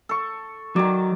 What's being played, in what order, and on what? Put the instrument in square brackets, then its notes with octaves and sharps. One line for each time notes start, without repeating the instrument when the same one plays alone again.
[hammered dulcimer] A4 C#6
[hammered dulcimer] D#3 D5 [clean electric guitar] F#3